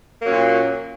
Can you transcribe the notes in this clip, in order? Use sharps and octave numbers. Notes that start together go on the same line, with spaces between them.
A#2 F#3 A#3 C#4